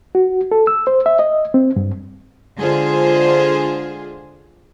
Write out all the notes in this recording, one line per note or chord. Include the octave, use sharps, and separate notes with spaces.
F#4
A4
E6
C5
E5
D#5
C4
G2
D3 G#3 F4 G#4 C5